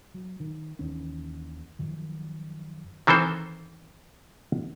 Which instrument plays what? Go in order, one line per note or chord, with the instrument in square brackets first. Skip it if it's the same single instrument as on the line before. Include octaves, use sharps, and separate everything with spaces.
[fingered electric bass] F#3
D#3
D#2 D#3 E3 C#4
F#2 D#3 F3
[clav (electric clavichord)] D#3 E3 C4 A4 C5